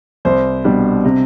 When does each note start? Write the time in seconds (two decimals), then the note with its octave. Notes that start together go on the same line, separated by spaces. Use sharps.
0.25 C2 C5
0.64 B2 G3 D4
1.05 C3